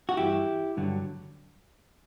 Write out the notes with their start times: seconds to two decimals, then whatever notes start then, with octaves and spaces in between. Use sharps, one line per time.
0.09 F#4
0.17 G2 E3 E4 G4
0.77 G2 D3 F#3